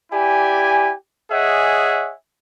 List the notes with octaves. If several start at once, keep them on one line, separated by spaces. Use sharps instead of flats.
E4 G4 D5 G#5
G#4 C#5 D#5 E5 F#5 G#5